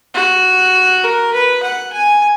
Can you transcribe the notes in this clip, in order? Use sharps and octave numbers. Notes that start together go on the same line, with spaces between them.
F#4
A#4
B4
F#5
G#5